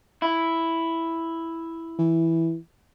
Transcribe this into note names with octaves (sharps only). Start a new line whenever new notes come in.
E4
E3